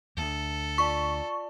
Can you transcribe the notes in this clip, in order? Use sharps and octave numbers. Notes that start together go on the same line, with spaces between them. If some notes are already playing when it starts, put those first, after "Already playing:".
D2 A4
F4 D5 A5 C#6